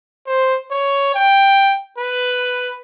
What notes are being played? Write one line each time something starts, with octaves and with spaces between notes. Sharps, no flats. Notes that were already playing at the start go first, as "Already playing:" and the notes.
C5
C#5
G5
B4